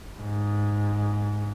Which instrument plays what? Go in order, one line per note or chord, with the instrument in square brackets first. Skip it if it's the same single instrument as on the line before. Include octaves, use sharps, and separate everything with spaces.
[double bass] G#2